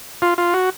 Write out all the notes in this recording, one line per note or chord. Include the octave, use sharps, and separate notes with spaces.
F4
F4
F#4